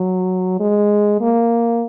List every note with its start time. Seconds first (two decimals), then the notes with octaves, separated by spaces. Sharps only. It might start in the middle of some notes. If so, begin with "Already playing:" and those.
Already playing: F#3
0.60 G#3
1.21 A#3